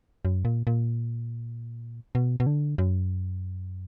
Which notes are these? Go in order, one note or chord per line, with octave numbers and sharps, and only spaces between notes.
F#2
A#2
A#2
B2
B2
D3
F#2